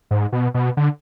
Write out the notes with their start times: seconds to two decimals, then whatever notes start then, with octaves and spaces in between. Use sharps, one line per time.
0.11 G#2
0.32 B2
0.54 B2
0.77 D3